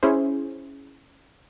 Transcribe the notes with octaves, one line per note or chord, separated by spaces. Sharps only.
C#4 E4 G#4 C5